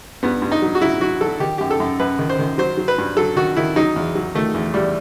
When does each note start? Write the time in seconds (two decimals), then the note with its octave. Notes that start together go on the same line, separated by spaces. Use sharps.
0.23 G2 B3
0.42 G2
0.52 D#4
0.62 F#3
0.75 F#4
0.81 F#3 E4
1.01 F#3 F#4
1.21 F#3 A4
1.40 D#3 G4
1.58 F#2 G4
1.71 A4
1.80 F#2
2.00 F#2 B4
2.19 D#3
2.29 C5
2.39 D#3
2.58 F#3 C5
2.77 F#3
2.88 B4
2.98 G2
3.17 F#3 A4
3.36 D#3 F#4
3.57 D#3 E4
3.76 F#3 D#4
3.96 E2
4.15 F#3
4.35 D#3 A3
4.54 E2
4.74 E2 G3